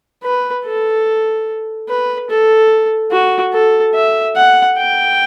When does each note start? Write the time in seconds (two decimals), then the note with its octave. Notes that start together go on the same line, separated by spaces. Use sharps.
0.24 B4
0.65 A4
1.89 B4
2.30 A4
3.12 F#4
3.53 A4
3.95 E5
4.36 F#5
4.78 G5